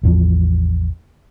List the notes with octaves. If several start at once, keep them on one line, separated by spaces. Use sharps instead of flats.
A1 E2 F3